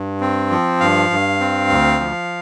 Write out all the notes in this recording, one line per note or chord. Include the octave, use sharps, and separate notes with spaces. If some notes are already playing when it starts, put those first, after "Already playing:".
Already playing: G2
C4
F3
G2 F5
G2
C4
D2
F3